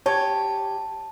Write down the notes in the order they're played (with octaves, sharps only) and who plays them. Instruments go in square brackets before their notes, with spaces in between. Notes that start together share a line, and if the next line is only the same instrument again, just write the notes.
[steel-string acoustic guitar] G4 [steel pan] C#5 [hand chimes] A5